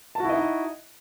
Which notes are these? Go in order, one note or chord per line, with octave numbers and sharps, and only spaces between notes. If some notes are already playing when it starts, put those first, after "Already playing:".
D#4 E4 F#4 D#5 A5